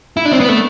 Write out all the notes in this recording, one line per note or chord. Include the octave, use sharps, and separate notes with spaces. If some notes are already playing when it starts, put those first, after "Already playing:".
E4
D4
C4
B3
A3